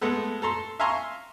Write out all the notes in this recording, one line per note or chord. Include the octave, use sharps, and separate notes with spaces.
G#3 A3 B3 A4
A4 A#5 C6
E5 F5 G#5 A#5 C6 C#6